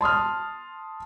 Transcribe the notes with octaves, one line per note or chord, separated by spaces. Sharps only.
A5 C6 D#6 F6